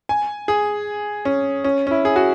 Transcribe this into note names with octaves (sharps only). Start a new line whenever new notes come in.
G#5
G#4
C#4
C#4
C#4
E4
G#4
F#4